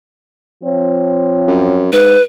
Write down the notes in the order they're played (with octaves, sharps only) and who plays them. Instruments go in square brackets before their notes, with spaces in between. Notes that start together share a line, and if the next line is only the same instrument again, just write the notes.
[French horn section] F3 C4 C#5
[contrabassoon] F#2
[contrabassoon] G#2 [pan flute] B4